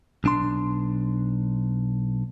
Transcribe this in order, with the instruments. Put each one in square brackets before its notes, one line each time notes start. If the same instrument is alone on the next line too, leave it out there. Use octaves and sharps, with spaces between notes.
[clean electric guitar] B1 D4 C6